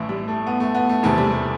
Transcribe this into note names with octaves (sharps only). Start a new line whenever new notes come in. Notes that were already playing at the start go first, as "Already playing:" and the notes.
Already playing: A1 A2 E3 E4
G3
A3
B3
A3
B3
A3
E1 E2 C3 E3 A3
G3
A3